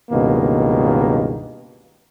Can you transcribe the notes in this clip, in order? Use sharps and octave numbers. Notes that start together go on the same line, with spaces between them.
C#2 G2 B2 D#3 A#3